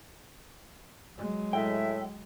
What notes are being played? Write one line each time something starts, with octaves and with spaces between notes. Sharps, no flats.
F#3 G#3
A2 E5 G5